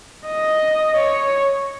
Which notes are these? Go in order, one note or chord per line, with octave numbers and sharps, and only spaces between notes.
D#5
C#5